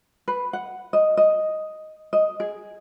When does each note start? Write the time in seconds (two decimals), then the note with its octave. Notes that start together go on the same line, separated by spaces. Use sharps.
0.28 B4
0.53 F#5
0.93 D#5
1.17 D#5
2.13 D#5
2.40 G#4